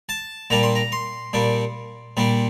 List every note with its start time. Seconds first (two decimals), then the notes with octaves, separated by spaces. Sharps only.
0.09 A5
0.50 A#2 G3 D4 A#5
0.63 C6
0.75 A#5
0.92 C6
1.33 A#2 G3 D4
2.17 A#2 G3 D4